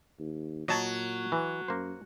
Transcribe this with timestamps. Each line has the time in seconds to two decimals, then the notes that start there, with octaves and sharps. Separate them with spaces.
0.20 D#2
0.68 A#2 F#3 D#5 A5
1.32 E3
1.68 F#2 A#3 C5